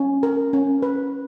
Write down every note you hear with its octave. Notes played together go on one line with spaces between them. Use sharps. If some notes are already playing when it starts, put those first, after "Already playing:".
Already playing: C#4
A#4
C#4
B4